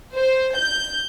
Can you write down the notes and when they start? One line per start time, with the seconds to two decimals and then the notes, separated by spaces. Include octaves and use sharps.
0.15 C5
0.57 G6